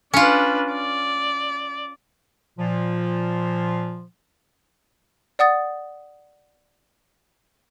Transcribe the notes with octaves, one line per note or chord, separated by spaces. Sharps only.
C#4 D4 F4 B4
D5
A#2 F3
D5 F#5 D#6 A6